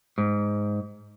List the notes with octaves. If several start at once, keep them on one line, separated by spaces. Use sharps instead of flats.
G#2